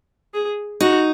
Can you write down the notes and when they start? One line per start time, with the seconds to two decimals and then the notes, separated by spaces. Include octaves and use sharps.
0.34 G#4
0.81 D#4 F#4